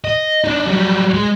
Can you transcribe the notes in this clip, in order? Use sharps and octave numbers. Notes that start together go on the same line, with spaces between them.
D#5
D4 D#4
F#3 G3
G#3